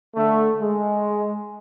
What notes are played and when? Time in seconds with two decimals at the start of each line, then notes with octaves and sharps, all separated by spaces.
0.15 D3 A3
0.60 G#3